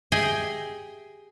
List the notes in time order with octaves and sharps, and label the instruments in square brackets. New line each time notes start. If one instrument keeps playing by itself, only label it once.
[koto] G4 G#4 D#5 E5 G5 G#5